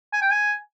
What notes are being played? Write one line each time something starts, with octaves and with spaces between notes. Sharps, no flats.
G#5
G5
G#5